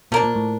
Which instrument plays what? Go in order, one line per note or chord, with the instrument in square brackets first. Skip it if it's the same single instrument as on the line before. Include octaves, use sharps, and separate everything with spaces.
[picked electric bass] B2 [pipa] F3 A#3 D4
[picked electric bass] A#2
A2